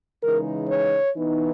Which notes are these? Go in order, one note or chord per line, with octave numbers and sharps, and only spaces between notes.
C#3 E3 G#3 D#4 A#4
C#5
E3 B3 D#4